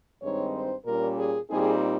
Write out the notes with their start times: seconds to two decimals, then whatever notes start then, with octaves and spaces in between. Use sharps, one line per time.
0.22 G2 D#3 G#3 C4 D#4 C#5
0.54 C5
0.85 A#2 G3 C#4 A#4
1.17 G#4
1.49 A#2 G3 C4 D#4 G#4